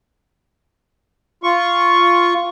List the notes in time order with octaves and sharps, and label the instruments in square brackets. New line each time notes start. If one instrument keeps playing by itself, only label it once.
[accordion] F4 C#6